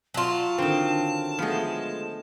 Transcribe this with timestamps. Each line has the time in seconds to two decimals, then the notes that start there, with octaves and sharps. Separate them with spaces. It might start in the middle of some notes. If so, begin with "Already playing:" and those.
0.14 F#3 F4 A5
0.58 D3 D#3 C4
1.39 F3 G#3 A3 B3